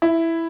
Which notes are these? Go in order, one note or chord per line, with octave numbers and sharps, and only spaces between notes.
E4